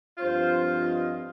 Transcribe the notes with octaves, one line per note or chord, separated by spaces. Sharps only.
G2 F3 C4 F4 C5
D#5